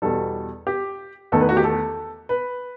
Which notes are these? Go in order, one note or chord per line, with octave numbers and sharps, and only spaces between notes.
E2 B2 G3 A4
G4
E2 D#3 A3 A4
B4
F#4
G4
A4
B4